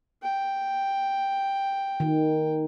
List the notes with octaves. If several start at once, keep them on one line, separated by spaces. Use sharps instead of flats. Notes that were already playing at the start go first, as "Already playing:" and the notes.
G5
D#3